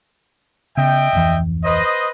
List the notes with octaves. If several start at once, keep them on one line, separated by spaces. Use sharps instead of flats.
C#3 B3 D#5 E5 G5
D1 F2 E3
B4 C5 D#5